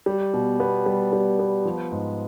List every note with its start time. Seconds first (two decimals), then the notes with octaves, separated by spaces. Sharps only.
0.06 G3
0.33 B2
0.60 B3
0.86 G3
1.13 G3
1.39 B3
1.65 F3
1.91 G#2